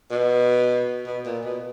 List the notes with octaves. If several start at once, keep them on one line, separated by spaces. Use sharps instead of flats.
B2
B2
A#2
B2